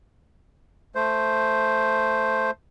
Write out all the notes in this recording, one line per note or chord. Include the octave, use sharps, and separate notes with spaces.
A3 C5